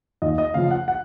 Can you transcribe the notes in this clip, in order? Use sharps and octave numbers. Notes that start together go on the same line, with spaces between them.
D#2 D#5
D#5
C#3 F3 F5
F#5
F#5